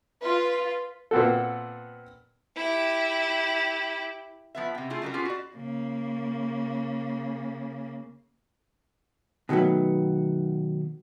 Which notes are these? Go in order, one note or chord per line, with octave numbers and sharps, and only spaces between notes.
F4 B4
A#2 B3 C4 F#4 A4
E4 G4
F3 B3 E5
C3 G5
A3 E4 F4 G#4
C#3 F#3 G3 G4 A#4
B3 C#4 F4 G4 G#4
F#4 D5
C#3 A#3
B2 D#3 F#3 A3 B3